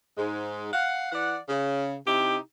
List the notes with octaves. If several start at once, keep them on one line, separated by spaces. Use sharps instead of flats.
G#2 G#3
F5 F#5
E3 D5 F#5
C#3
C3 D#4 E4 G4